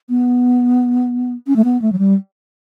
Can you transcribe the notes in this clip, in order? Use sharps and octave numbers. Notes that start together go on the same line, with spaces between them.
B3
C#4
A3
B3
A3
F#3
G3